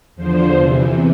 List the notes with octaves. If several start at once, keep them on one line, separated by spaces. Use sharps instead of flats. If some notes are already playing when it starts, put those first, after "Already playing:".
E2 D3 F3 C5
E2 C3 E3